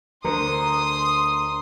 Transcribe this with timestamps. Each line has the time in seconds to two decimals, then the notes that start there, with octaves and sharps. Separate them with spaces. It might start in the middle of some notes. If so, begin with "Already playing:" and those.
0.24 D2 D3 A#4 C5 C6 D#6